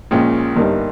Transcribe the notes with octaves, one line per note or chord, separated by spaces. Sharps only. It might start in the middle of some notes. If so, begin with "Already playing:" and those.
A#1 A#2 G#3 C#4
G1 G2 G3 A#3 D#4